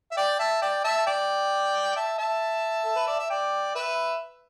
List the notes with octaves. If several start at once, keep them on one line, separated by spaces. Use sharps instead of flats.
E5
D5 G5
E5 A5
D5 G5
E5 A5
A5
D5 G5
E5 A5
E5 A5
A4
B4
D5
E5
D5 G5
B4 E5